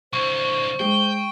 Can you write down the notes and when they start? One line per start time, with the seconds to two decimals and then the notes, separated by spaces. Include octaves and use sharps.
0.13 C2 D3 C5 C#6
0.80 G#3 G5